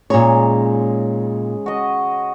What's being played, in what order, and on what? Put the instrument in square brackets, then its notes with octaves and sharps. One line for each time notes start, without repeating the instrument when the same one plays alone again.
[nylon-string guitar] A#2 C#5 [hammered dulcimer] C#3 G#3 D#4
[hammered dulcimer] F#4 D#5